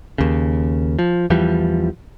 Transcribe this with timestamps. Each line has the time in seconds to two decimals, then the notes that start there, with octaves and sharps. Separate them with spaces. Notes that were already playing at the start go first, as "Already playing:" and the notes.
0.18 D#2 C#3
0.99 F3
1.30 E2 E3 F3 G3